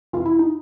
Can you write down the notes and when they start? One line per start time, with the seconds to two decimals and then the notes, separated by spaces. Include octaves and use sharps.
0.13 F2 C3 E3 F4
0.26 E4
0.39 D#4